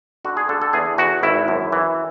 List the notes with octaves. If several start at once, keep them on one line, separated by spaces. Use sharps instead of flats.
D3 F#4
G#4
D3 A4
A4
E2 G#4
E2 F#4
G#1 E4
F#2
E3